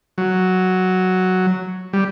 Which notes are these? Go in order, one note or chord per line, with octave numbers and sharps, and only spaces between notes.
F#3
G3